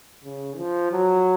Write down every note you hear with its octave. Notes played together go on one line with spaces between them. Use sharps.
C#3
F3
F#3